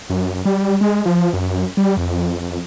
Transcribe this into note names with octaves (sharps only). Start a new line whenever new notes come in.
F#2
G3
G#3
F3
F#2
G3
F2